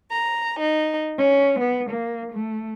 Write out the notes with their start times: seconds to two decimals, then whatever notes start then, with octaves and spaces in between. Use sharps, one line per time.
0.11 A#5
0.60 D#4
1.17 C#4
1.59 B3
1.90 A#3
2.32 A3